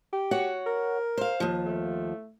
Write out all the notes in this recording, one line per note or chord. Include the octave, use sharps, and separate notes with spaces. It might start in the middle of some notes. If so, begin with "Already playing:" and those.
G4
F#4 C#5 F#5
A#4
C5 F5
D#2 F3
A3